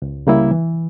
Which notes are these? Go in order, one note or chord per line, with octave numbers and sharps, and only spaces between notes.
C#2
C#3 G3 A#3 E4
E3